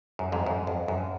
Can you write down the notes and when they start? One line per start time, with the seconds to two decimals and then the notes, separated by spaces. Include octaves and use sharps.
0.19 F#2
0.32 F2 G#2
0.46 F#2
0.67 F2
0.88 F#2